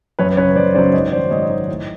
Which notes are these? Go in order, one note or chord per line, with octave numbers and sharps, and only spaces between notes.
F#2 B4 C#5
C#3 F#3 B4 C#5
F#2 C5 D5
C#3 F#3 C5 D5
G#2 C#5 D#5
D#3 F#3 C5 D5
G#2 C#5 D#5
D#3 F#3
A2